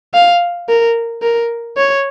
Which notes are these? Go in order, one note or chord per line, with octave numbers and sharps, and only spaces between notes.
F5
A#4
A#4
C#5